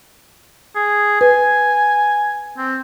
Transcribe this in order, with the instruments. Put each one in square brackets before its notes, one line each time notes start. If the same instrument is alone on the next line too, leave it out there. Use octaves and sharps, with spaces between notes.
[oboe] G#4
[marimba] B4 [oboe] G#5
[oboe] C4